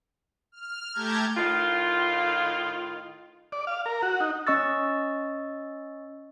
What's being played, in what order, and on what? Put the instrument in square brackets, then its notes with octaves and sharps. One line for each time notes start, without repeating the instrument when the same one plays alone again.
[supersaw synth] F6
A3 G4 A5 A#5 G6 G#6
[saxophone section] A2 D#3 F4
[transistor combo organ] D5
F5
A#4
F#4
D#4
[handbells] C#4 D#5 C#6 E6 A6